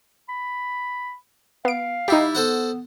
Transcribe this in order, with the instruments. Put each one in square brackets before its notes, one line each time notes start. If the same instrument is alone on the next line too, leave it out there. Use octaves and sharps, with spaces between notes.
[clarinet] B5
[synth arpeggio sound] B3 D7 [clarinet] F5
[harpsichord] G3 E4 [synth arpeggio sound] D#4 G4
[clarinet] B3 [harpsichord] A4 C5 F#5